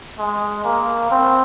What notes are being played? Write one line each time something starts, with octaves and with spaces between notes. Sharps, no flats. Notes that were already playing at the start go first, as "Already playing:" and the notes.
G#3
A#3
C4